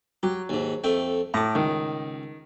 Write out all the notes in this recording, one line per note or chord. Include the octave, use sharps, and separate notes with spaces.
F#3 G4
D#2 G#2
F2 A3 G5
A2 A#5 D6
C#2 D#3